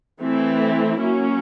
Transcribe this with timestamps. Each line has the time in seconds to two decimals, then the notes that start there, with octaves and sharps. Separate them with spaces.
0.21 E3 A3 C4 E4
0.99 F#3 A#3 C#4